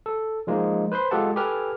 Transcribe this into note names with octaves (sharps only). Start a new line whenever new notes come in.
A4
F3 G#3 A#3 D#4
B4 C5 B5 C6
G#3 F4 G4 A4 F#5 A5
G4 A4 B4 G#5 F6